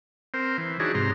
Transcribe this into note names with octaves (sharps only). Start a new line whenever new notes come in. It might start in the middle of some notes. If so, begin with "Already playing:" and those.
C4 A#4 C5
E3
E3 D4 D#4 F#4 G#4 C#5
G#2 C3 A#5 C6